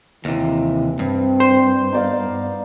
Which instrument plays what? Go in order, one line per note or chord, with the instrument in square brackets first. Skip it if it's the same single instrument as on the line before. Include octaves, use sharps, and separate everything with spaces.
[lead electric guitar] D#2 C3 [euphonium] E3
[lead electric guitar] G2 [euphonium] C4
[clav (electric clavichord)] C5
[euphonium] B3 [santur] D#4 D5 F5